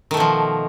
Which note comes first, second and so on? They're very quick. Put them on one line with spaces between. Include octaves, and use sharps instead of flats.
D#3 A3 B2 F3